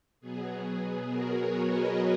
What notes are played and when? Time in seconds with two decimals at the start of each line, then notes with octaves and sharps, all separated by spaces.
0.21 B2 F#3 B3 G#4
0.64 G#4
1.08 F#4 A#4
1.37 A#4 C#5
1.65 B4 D#5